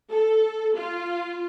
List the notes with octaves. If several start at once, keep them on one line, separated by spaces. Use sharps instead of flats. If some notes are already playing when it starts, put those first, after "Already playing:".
A4
F4